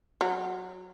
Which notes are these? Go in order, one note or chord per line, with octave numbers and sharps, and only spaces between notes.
F#3